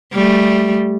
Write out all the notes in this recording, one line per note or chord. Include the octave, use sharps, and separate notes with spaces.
G3 A3